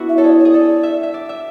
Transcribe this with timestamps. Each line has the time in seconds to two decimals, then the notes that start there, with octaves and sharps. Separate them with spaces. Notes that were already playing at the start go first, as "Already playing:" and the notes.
Already playing: B3 D4 E4 F#4
0.09 E5
0.17 A4 C#5
0.24 G#4 D5
0.39 C#5
0.45 G#4
0.54 A4 D5
0.83 E5
1.03 E5
1.14 D5
1.29 E5